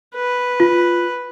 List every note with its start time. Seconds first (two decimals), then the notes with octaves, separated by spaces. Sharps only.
0.15 B4
0.60 F4